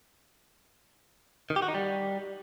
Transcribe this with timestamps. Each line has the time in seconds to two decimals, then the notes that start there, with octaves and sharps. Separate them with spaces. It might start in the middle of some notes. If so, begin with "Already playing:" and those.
1.50 D#3
1.56 G4
1.62 F#4
1.68 D#4
1.74 G3